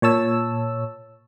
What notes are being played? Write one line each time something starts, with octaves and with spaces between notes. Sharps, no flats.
A#2 C#5 A5 E6